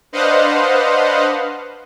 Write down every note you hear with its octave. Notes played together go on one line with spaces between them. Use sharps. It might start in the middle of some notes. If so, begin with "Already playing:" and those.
D4 B4 C5 D#5 F5 F#5